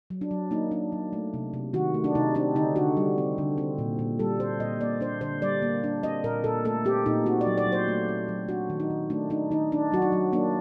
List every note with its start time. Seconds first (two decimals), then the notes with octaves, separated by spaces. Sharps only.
0.10 F#3
0.21 D4
0.31 F#3
0.51 A#3 D#4
0.71 D4
0.92 F#3
1.13 A3
1.34 C3
1.54 C3
1.73 D#3 F#4
1.94 A3
2.04 D4
2.15 C3 D#4
2.35 C4 D4
2.55 D3 D#4
2.76 D3 F#4
2.97 G3
3.18 C4
3.38 D3
3.58 C4
3.78 A#2
3.99 A#2
4.19 G3 A4
4.40 C4 C5
4.60 A#2 D#5
4.81 A#3 D5
5.01 D4 C5
5.21 D3 C5
5.42 G3 D5
5.62 A#3
5.84 D4
6.03 C4 D#5
6.23 A#2 A#4
6.44 A#2 A4
6.65 A3 A4
6.85 C4 G4
7.06 A#2 D#4
7.26 C4 F#4
7.41 D5
7.47 F#3
7.57 D5
7.67 F#3
7.72 C5
7.88 A3
8.09 C4
8.29 F#3
8.49 D4 F#4
8.70 D#3
8.80 D#4
8.90 D#3
9.10 A3 D4
9.30 D4 D#4
9.51 D#3 D#4
9.72 D4
9.92 F#3 F#4
10.02 D#4
10.12 F#3
10.33 A#3 D4